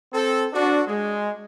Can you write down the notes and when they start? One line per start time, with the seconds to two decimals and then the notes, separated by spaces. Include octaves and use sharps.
0.13 C4 A4
0.53 D4 F#4
0.88 G#3